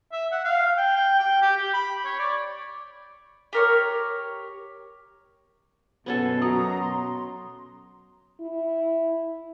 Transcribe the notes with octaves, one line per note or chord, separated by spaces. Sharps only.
E5
F#5
F5
G5
G5
G5
G4
G4
B5
C#5
D5
G4 A#4 C#5
F#2 B2 B3 C#4 A4
F#3 A#5 D#6
C6
E4